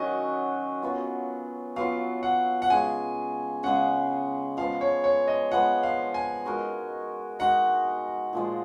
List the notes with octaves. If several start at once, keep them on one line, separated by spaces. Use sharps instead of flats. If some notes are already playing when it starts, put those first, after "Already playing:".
Already playing: D#3 F#3 C#4 F#4 D#5
F#3 B3 F4
F#3 B3 F4 F5
F#5
F#5
C#3 G#3 C#4 G#5
C#3 G#3 C#4 F#5
F3 G#3 B3 F5
C#5
C#5
D#5
F3 G#3 B3 F#5
F5
G#5
G#3 D#4 F#4 A#4
G#3 D#4 F#4 A#4 F#5
A#2 F3 G#3